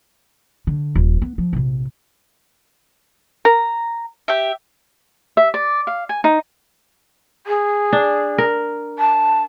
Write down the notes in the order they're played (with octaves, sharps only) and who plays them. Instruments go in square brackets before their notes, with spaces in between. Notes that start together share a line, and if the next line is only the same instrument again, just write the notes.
[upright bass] D3
D#1
B3
F3
A#1 C3
[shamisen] A#4 [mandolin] A#5
[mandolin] G4 E5
[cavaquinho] E5
D5
F5
G#5
D#4
[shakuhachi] G#4
[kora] D4
A#4
[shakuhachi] A5